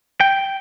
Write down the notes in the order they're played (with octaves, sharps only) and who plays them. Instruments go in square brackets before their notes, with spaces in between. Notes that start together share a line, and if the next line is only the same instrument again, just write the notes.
[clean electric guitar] G5